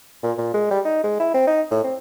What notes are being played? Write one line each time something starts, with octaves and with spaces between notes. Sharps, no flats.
A#2
A#2
G#3
G3
D#4
G#3
E4
C4
D#4
A2
C4